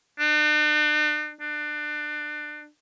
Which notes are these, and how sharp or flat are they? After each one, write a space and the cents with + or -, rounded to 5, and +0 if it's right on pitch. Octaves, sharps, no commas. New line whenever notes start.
D4 +45
D4 +30